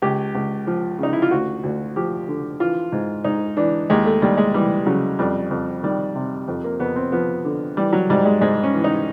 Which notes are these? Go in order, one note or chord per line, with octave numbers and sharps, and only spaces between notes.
C#2 G4
C#2
F3
C#3 D#4
E4
F4
D2 F#4
D2
F3 G4
D3
E3 F4
G#2
G#2 D#4
E3 D4
D#2 G#3
A3
D#2 G3
G#3
E3 G3
C#3 F#3
F2 G3
F2
D#3 G3
C3
F2
A#3
F2 B3
C4
F3 B3
D3
E3 G3
F#3
G#2 G3
G#3
G#2 G#3
C#4
E3
D#4